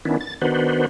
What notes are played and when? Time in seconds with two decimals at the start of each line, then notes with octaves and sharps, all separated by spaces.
0.05 D#3 B3 C#4 D4 E4
0.21 A6
0.42 D#3 B3 D4 F#4 B4 C5